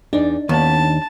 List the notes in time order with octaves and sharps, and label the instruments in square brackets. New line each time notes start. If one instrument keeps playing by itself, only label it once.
[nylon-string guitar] E2 D5 [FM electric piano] D4 D#4
[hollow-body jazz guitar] D#2 [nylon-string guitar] B3 C#4 E4 [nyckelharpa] A5